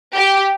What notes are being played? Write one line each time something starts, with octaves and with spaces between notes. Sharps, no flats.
G4